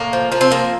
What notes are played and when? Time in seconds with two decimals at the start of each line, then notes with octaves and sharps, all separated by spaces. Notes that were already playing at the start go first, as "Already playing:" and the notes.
Already playing: A2 A#3
0.13 F3
0.32 F3 A#3
0.41 C4
0.51 F3 A#3